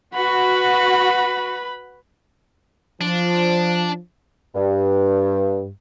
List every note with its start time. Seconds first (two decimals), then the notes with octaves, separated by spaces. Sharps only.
0.14 F#4 B4 B5
3.01 F3 D4
4.55 G2